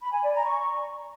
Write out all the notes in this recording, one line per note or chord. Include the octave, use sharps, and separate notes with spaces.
B5
G#5
D5
A#5
C#6